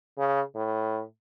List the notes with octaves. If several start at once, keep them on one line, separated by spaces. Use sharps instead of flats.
C#3
A2